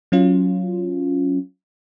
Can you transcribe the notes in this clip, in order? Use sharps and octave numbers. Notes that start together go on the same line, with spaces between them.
F#3 C#4 F4